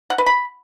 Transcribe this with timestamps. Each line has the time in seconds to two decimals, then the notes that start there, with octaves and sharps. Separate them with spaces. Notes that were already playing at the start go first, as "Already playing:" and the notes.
0.10 F#5
0.18 B4
0.26 B5